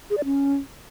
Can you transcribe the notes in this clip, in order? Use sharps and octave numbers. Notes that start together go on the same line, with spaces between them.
G#4
D5
C#4